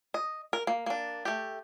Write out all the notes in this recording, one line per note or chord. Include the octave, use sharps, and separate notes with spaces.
D#5
A#4
A#3
A#3 D4
A3 G4